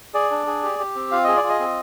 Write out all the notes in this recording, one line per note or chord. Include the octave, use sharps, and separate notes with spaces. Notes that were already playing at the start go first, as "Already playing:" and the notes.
G#4 D5
D4
G#4
G4
G4
C4
F4 F5
G#4 D#5
D5
F4
D#5
C4